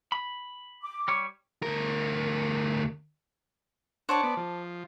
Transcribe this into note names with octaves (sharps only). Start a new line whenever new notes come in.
B5
D6
G3 C#5
D2 A#4
D4 C5 C#5 F#5 A5 D6
B3 D5
F3